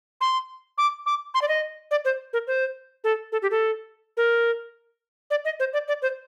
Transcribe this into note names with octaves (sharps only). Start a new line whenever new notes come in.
C6
D6
D6
C6
D5
D#5
D5
C5
A#4
C5
A4
A4
G4
A4
A#4
D5
D#5
C5
D5
D5
C5